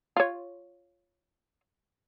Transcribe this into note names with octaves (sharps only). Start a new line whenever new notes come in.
F4 C#5